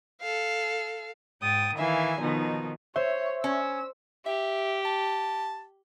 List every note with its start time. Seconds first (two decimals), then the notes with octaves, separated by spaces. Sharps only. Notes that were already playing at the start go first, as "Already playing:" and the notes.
0.21 A4 F5
1.42 G#2 G5 D#6 A6
1.76 D#3 E3 E5 F5 G#5
2.21 B2 D#3 F3 D#4
2.96 C5 C#5 E5
3.44 C#4 E6
4.26 G4 E5
4.85 A5